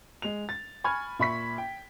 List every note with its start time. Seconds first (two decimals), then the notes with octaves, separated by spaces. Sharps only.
0.22 G#3 F7
0.49 A6
0.84 G#5 B5 C#6 F6 G#6
1.19 A#2 E5 B5 C#6 B6
1.58 G5